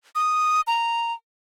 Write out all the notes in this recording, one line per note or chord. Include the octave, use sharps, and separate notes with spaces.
D#6
A#5